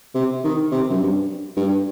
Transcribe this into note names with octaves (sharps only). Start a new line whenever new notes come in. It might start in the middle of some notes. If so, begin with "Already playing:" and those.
C3
D#3
C3
F#2
G2
G2